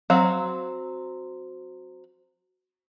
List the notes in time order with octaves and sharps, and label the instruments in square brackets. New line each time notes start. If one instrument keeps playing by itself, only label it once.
[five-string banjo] F#3 C4 F5 A#5